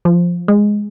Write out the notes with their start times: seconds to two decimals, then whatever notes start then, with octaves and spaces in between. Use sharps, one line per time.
0.05 F3
0.48 G#3